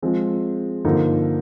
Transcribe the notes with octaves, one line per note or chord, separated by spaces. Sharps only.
F3 G#3 C4
G2 D3 F3 A#3 D#4